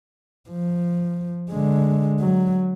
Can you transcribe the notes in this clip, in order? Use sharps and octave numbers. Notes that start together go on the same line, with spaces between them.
F3
D3 G#3
F#3